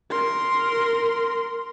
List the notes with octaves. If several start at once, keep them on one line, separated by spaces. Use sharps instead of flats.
A#4 C6